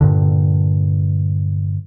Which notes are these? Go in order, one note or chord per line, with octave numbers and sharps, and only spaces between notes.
G2 A#2 D3